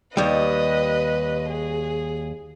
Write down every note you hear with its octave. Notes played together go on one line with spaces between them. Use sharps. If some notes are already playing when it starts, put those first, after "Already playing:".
D#2 G3 B4 D#5
G#4